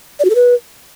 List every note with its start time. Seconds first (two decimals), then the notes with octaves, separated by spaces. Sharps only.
0.19 D5
0.25 F#4
0.30 A4
0.35 B4